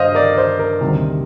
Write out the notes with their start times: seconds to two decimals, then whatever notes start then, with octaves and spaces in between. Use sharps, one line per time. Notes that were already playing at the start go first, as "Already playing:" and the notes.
Already playing: G2 C5 D#5 F5
0.15 A#4 D5
0.38 C5
0.59 A#4
0.81 D2 C3 D#3 G3